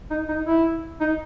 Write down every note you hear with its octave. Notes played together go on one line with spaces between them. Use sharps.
D#4
D#4
E4
D#4